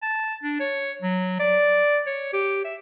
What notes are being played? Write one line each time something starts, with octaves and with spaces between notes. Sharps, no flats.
A5
D4
C#5
F#3
D5
C#5
G4
E5